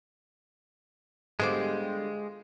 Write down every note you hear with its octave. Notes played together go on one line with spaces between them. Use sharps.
D3 G3 G#3 B3 F4 C5 D6